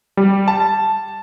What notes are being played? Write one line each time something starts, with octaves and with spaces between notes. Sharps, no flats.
G3
A5